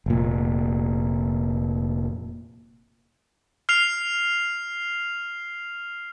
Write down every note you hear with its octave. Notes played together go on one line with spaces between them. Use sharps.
F1 A#2
F6 C7 F7